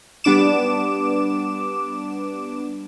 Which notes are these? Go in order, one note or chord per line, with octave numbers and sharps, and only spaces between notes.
G3 B3 D4 D6 E7